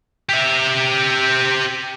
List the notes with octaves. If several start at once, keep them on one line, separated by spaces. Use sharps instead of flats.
G4 E5